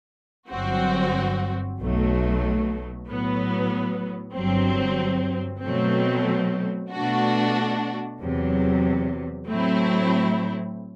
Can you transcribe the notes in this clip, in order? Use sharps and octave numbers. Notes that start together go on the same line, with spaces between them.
G1 G2 F#3 C4 F#4
B1 B2 F#3 A3
A2 F#3 B3
G1 G2 F#3 C4
B2 F#3 A3 C4
B2 A3 D4 F#4
E2 C3 F#3
A2 F#3 A3 C4 E4